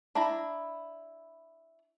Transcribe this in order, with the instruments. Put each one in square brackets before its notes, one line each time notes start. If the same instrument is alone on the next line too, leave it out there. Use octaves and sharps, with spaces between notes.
[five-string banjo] D4 E4 A#5